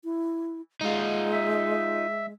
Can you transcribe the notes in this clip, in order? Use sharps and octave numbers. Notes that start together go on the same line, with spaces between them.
E4
G#3 D#4 F4
E5